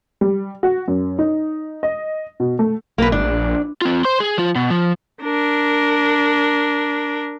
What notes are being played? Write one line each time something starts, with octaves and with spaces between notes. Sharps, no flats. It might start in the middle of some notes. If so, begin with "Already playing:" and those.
G3
F#4
F#2
D#4
D#5
B2
A3
B1 A#3 B4
G1 D4
A#1
C4 F4
C5 C6
G#4
F3 F4
B2
F3
D4 A#4